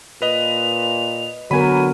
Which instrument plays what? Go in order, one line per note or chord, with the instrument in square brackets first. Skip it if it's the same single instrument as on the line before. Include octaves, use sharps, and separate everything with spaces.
[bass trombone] A#2 [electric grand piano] B4 D#5 [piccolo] F7
[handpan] D3 B3 A#4 [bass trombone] F#3 [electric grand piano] G#5 B5 [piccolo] D#7